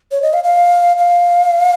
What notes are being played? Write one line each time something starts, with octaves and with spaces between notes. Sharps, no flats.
C#5
D#5
F5
F5
F5